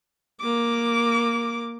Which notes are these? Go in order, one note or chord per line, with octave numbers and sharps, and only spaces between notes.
A#3 D6